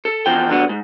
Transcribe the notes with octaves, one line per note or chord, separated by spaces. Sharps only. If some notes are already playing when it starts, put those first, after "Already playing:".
A4
E2 F3 G5
D3 F#3 B3
G#2